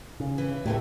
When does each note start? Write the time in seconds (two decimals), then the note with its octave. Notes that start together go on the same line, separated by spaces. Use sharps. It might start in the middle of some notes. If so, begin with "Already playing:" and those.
0.20 C#3
0.38 E3
0.65 A2 C3 E3 A3